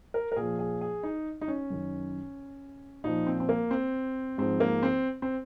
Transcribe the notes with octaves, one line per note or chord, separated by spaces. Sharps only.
A#4
A#4
A#2 F3 G#4
G#4
G#4
D#4
D#4
C#4
F#2 D#3
A#2 F3 D#4
C4
C4
A#3
C4
G#2 F3 C4
A#3
C4
C4